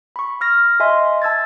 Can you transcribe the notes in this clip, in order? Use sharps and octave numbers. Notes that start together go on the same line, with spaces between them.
B5 C#6
C#6 F6 A#6
D#5 E5 G#5 C6
A5 E6 G#6 A6